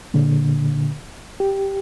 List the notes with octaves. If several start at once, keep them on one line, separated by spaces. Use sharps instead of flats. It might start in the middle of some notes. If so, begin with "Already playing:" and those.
A#2 D3
G4